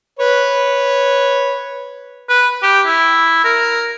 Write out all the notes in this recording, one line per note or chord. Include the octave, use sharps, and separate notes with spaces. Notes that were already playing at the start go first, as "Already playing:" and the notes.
B4 C#5
B4
G4
E4
A#4